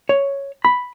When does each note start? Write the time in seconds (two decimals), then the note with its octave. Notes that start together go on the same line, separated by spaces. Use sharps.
0.09 C#5
0.65 B5